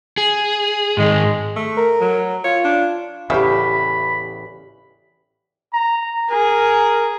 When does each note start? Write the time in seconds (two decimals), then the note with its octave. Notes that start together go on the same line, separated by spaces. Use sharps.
0.18 G#4
0.97 G#2 D#3 G#3
1.56 A3
1.77 A#4
2.01 F#3
2.44 F4 C#5
2.64 D4
3.30 A1 E2 C#3 G4 E5 B5
5.73 A#5
6.30 G#4 A#4